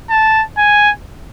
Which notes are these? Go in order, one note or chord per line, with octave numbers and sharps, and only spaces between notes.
A5
G#5